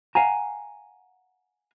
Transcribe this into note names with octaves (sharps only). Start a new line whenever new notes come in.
F5 F#5 G#5 A#5